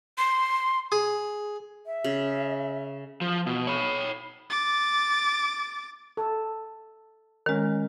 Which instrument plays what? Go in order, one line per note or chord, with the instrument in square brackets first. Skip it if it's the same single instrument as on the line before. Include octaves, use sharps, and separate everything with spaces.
[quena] C6
[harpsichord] G#4
[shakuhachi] E5
[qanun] C#3
[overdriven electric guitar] F3
B2
C#5 B5
[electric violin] D6 A6
[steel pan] A4
[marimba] D#3 G#3 [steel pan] C#4 A#4